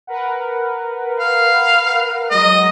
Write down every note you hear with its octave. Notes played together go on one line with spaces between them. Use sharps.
A#4 B4 F#5
F5
F#3 G#3 D#5